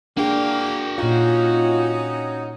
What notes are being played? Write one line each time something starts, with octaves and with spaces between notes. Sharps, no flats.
A#3 D4 F#4 G#4 G5
A#2 C#4 D#4 F4 F5